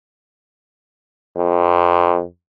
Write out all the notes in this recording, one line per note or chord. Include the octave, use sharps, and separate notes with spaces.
F2